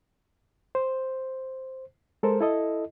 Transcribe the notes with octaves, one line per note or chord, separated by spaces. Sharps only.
C5
G#3 A4 A#4 C5
E4 A4 D#5